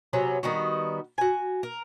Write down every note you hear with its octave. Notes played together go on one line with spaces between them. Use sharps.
C3 F#3 B3 C#4
D#3 G3 B3 F#4
F#4 G#5
A#4